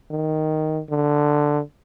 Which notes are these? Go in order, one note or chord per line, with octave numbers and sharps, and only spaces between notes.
D#3
D3